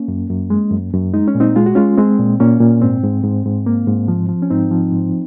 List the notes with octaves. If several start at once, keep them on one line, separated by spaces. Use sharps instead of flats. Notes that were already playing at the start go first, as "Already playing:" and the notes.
Already playing: A#3 C#4
F#2
F#2
G#3
F#2
F#2
G#3 D#4
C#4
A#2
C4 D#4
G#3 F4
F#4
G#3 C#4 F4
G#3 C4
A#2
A#2 A#3 C#4
A#2
G#2 C4
G#2
G#2
G#2
A#3
G#2
F3
F3
C#4
G#2 C4 D#4
F3
G#2